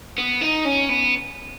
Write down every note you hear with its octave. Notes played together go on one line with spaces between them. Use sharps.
B3
D#4
C#4
B3